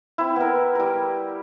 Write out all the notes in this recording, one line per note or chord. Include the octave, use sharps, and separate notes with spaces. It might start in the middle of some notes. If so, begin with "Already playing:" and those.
C4 E4
B3 A#4
G3 A#4